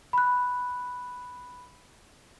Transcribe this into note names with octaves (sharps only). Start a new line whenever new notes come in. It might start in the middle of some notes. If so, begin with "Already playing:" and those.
B5 F#6